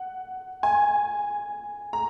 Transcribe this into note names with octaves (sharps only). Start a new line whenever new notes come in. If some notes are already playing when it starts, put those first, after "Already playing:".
Already playing: F#5
G#5
A#5